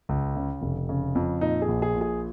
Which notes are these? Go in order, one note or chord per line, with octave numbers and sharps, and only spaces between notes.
C#2
C#3
F1
C#3
F2
A#2 D#4
G#4
A#1
G#4
A#2
G#4